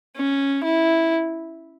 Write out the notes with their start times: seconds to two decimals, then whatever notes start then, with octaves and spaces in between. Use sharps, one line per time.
0.16 C#4
0.64 E4